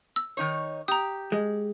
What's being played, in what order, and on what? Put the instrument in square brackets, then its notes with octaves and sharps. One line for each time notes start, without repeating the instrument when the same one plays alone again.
[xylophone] E6
[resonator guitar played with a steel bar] D#3 D#4 C#5
[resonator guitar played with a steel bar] G4 [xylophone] A#5 D#6
[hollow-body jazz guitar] G#3